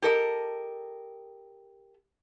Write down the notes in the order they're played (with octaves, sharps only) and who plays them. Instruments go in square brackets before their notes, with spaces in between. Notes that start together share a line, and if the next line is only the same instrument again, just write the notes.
[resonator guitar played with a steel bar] G4 A4 A#4 D#5